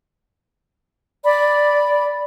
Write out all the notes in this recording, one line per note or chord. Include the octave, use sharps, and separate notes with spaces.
D5 B5